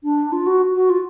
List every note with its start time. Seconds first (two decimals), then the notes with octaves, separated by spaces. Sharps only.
0.03 D4
0.32 F4
0.46 F#4
0.75 F#4
0.90 F4